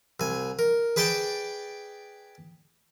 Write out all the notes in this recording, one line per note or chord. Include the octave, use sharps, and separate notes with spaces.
C2 G#5
A#4
G#4 B4 D5 G5 A5